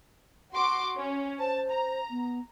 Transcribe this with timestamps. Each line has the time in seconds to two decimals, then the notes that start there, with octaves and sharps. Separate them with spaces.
0.53 F#4 C6 D6
0.97 C#4
1.39 C5 A5
1.70 A#5
2.10 B3